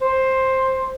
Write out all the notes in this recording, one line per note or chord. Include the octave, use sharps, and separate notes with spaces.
C5